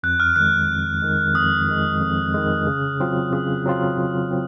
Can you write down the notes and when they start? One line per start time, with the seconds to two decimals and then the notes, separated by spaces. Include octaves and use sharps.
0.03 F2 F#6
0.20 F6
0.36 D#3 G#3 F#6
0.69 F2
1.02 D#3 G#3
1.34 F2 D#6
1.68 D#3 G#3
2.01 F2
2.34 D#3 G#3
2.67 C#3
3.00 F#3 C4 F4
3.33 C#3 D#6
3.66 F#3 C4 F4
3.98 C#3
4.31 F#3 C4